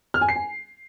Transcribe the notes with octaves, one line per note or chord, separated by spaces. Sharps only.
F6
G#5
C7
G#5